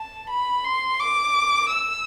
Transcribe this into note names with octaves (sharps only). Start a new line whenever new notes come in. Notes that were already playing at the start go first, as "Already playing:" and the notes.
Already playing: A5
B5
C6
D6
E6